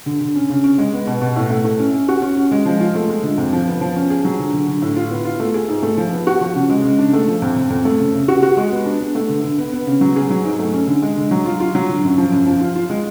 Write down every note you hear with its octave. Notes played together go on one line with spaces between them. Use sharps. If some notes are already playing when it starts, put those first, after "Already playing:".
D3
D3
C#4
C#3
C#4
G#3
B3
B2
B2
A2
A3
A3
C#4
C#4
F#4
C#4
C#4
G#3
F3
F4
A3
G#3
D3
F2
F3
B3
F3
C#4
G#4
F#3
D3
D3
D3
A2
F4
B3
F4
A3
G#4
G#2
A3
F3
B3
F#4
F3
C#3
G#3
C#3
D4
A3
F3
F2
F2
F2
A3
C#3
C#3
F#4
F#4
G#3
B3
D4
D4
A3
D3
D3
B3
B3
C#3
F#3
G#4
F#3
G#2
A3
C#4
D3
G#3
D3
F#3
F4
F4
F#3
D3
F#2
F3
F#2
F3
F4
F4
G#3